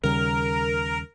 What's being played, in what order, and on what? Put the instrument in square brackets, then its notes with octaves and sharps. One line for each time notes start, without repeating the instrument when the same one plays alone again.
[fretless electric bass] D#2 C#3 G3 [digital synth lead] A#4